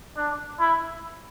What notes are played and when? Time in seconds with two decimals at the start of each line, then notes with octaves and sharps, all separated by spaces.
0.17 D4
0.60 E4